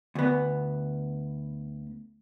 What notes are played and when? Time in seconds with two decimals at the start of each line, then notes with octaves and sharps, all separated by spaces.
0.15 D2 B3